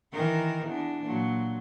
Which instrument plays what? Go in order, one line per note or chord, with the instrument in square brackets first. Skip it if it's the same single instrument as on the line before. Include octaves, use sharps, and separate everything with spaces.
[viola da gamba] D#3 E3 A#4
E2 D4
A#2 F#3